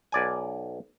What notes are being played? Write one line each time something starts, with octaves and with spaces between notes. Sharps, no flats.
B1 D5 G#5